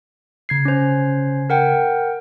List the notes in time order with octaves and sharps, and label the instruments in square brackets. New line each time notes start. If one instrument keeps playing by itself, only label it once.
[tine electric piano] C#3 G#6 C7
[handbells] C#4 C5
A#4 F#5 G5